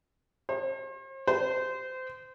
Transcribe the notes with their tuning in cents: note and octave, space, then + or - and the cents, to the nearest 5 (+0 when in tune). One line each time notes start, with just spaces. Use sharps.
C5 +40
C5 -25